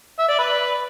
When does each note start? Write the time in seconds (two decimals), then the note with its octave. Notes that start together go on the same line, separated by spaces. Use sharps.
0.19 E5
0.29 D5
0.39 B4